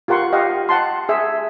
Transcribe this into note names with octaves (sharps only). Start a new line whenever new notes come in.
F4 G4 A#4 F#5 C6 C#6
G4 D#5 F5 F#5
F#5 A5 C6
G#4 E5